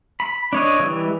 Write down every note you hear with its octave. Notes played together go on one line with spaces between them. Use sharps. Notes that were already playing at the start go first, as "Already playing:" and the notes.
B5
D4 C#5 D#5
E3 G3